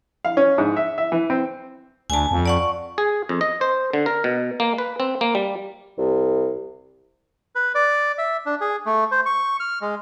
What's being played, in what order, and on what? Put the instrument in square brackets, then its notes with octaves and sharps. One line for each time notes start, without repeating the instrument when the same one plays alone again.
[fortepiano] F5
C#4
G#2
E5
E5
E3
C4
[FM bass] D2 [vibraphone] G#5 A5
[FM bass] F2
[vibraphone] D5 F#5 C#6
[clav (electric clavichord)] G#4
F2
D#5
C5
D3
A#4
B2
A#3
B4
C4
A#3
G3
[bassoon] C2
[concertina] B4
D5
E5
D4
G#4
A3
C5
C#6
F6
G#3